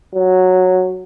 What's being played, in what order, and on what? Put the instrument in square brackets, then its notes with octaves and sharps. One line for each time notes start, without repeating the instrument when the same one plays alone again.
[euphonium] F#3